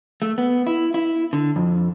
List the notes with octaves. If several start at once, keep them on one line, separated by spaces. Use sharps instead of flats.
A3
B3
E4
E4
D3
F2